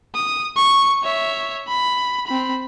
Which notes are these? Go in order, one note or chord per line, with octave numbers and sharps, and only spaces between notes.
D#6
C#6
C#5 E5
B5
C4 B5